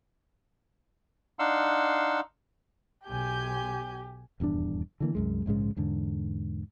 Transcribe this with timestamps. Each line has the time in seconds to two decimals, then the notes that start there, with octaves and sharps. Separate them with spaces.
1.39 D4 D#4 F5 F#5 C6 E6
3.06 B1 G4 G#5 G6
4.40 D#1 E2 G2 D4
5.00 D3 E3 A#3
5.15 C2 F#2 G#3
5.46 A#1 G#2 C#3 G#3
5.77 E2 G#2 D3